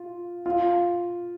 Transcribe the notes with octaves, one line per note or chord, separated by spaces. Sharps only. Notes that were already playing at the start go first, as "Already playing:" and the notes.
Already playing: F4
F4